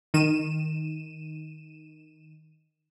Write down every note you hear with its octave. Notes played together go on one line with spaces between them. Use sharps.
D#3 D#7 E7